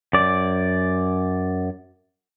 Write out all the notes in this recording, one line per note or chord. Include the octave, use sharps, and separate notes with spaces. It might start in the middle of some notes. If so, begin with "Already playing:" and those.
F#2 D5